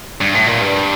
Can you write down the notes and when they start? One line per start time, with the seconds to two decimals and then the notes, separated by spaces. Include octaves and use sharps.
0.21 G2
0.35 A2
0.47 A#2
0.62 G2